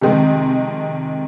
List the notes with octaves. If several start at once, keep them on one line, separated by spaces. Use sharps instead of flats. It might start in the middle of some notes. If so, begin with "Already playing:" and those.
F2 C3 D#3 G#3